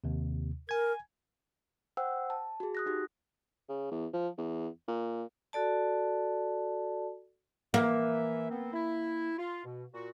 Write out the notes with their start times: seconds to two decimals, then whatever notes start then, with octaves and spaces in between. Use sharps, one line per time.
0.04 D#2 C3
0.69 A#4 G#5 G#6
1.97 C5 F#5 G5 E6
2.30 A5
2.60 F#4 G#4
2.75 D#6 F#6 A#6
2.86 D#4 F#4 G4
3.69 C#3
3.91 E2
4.13 F3
4.38 E2
4.88 A#2
5.53 F#4 A4 D5 A5
7.74 E3 A#3 E5
8.50 B3 C4
8.73 E4
9.38 F4
9.65 B2
9.93 A#2 F#4